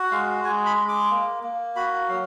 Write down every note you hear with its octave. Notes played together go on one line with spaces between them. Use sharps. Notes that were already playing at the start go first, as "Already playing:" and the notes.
Already playing: F#4
G#3 F5
G#3 G#5
B5
G#3
D6
A#3
A#3
F#4 B5
F#3 F5